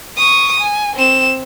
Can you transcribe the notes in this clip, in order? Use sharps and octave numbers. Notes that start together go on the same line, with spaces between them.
C#6 D#6
G#5
C4 E7